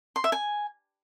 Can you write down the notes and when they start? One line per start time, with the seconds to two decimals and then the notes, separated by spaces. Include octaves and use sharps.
0.16 C6
0.24 E5
0.32 G#5